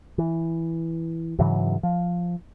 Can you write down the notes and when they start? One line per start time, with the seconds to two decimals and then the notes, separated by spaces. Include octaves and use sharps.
0.18 E3
1.39 G#2 C#3 E3 F#3
1.83 F3